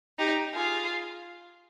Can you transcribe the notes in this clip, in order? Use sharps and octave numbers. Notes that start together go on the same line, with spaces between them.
D#4 G4
F4 G#4